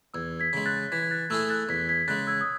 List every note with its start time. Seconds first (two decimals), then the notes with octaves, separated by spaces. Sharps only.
0.14 E2 E6 G#6
0.40 G#6 B6
0.53 C#3 G#3
0.65 F#6 A6
0.92 E3 G#6 B6
1.02 G#6
1.11 F#6 A6
1.30 A3 E4 G#4 E6 G#6
1.50 F#6 A6
1.69 E2 G#6 B6
1.89 G#6 B6
2.07 C#3 G#3 F#6 A6
2.27 E6 G#6
2.41 D#6